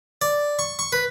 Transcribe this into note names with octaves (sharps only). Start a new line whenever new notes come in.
D5
C#6
C#6
B4